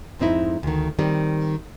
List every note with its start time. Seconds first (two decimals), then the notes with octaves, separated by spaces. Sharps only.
0.19 F2 G#2 C4 D#4 E4
0.63 D2 D#3
0.99 D#3 G3 C4